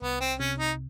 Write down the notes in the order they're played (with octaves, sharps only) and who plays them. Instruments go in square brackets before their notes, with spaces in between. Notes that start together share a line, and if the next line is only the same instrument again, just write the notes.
[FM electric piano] C2 [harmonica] B3
[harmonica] C4
[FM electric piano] C3 [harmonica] C#4
[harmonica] D#4